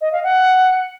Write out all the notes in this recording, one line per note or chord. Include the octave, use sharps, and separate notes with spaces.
D#5
F5
F#5